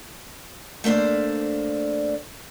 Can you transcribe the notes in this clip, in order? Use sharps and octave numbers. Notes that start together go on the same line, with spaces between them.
A3 A#3 D4 C5 D5